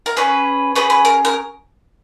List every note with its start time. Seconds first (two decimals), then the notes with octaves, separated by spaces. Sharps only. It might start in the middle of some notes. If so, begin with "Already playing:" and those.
0.06 A#4
0.16 C#4 G#4 B4
0.76 C#4 G#4 B4
0.90 B4
1.05 A#4
1.25 A#4